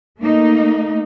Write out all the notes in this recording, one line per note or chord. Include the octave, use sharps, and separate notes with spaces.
A3 A#3 D#4